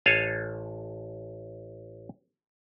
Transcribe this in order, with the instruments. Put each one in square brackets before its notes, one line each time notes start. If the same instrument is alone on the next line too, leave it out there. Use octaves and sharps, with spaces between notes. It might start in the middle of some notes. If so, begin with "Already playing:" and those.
[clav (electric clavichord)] A1 A4 C#5 F5 G#5